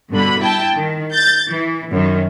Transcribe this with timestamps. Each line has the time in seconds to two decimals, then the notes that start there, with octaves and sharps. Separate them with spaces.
0.11 G2 B2 D3 B5
0.40 E4 G5 A5
0.76 D#3
1.12 G6 A6
1.48 E3
1.91 F#2 D#3